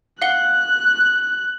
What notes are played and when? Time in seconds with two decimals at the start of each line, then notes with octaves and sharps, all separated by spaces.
0.22 F5 F#5 F#6 G7